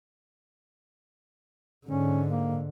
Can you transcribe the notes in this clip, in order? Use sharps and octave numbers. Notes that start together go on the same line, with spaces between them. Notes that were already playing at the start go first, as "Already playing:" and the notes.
G#2 D3 C#4
A#3